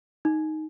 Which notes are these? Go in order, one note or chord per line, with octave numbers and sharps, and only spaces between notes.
D#4